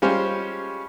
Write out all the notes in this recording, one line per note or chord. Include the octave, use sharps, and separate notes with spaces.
G3 G#3 C#4 F4 G4 C5